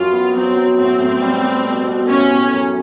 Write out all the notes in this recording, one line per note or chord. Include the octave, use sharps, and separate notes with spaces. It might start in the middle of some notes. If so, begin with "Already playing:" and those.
Already playing: F#2 F#3 F4 G4
B3
F#3 C4
F#3
A2 C4
A2
G3
G4
B2
B2
A2 C#4
A2
F#2